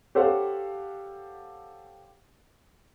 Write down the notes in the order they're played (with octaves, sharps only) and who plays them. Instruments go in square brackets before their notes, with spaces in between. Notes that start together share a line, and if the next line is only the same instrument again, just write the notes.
[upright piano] G4 A4 C5 C#5 F5 F#5